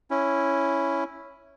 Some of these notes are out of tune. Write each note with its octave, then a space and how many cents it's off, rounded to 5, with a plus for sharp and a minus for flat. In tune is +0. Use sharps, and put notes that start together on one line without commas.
C#4 +0 E4 +0